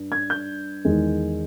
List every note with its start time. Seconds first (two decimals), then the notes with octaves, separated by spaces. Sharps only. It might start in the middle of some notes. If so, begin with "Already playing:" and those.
Already playing: G2
0.12 G#6
0.30 G6
0.85 E2 D#3 G#3